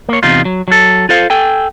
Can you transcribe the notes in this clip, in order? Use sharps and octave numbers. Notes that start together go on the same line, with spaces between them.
A#3 C#5
E2 C3 D#4 F4
F#3
F#3 A4
F4 A4 C5 F5
A4 G5 G#5